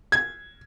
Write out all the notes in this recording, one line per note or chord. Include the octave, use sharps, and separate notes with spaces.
G#6